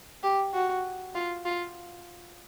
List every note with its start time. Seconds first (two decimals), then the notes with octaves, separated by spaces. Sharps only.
0.23 G4
0.54 F#4
1.15 F4
1.45 F4